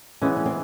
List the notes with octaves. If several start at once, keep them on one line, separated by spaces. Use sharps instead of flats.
E3 G#3 B3 C#4
C#4
C4